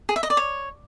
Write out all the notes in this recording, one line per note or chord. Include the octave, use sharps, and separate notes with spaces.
G#4
E5
D#5
D5
C#5